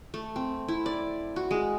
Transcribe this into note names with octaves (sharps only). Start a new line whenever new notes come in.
A3
C4
E4
D5
F#4
G#3